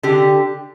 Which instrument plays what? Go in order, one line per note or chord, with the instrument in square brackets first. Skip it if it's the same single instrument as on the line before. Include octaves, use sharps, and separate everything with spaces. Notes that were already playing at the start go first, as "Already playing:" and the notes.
[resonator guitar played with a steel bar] D3 G4